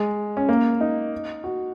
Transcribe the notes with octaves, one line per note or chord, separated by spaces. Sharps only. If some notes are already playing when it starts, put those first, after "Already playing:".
Already playing: G#3
C#4
A#3
D#4
F#4